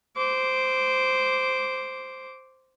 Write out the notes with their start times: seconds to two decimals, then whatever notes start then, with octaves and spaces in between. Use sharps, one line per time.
0.17 C5 D6